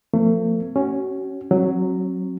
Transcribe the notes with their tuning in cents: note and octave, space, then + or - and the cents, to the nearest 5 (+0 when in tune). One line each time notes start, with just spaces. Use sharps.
F3 +5 A3 +40 C4 -40
C#4 +0 F#4 +35
F#3 +0 C4 +45